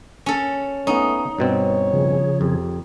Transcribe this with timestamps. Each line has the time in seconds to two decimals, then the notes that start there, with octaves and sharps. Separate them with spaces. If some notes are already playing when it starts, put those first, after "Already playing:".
0.26 C#4 A4
0.87 A3 B3 C#4 D#4
1.39 G2 B2 C4 C#5
1.92 C#3 F3 G#4
2.41 F2 G4